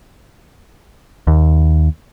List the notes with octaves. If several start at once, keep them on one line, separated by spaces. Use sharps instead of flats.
D#2